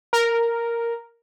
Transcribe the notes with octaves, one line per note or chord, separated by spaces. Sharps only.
A#4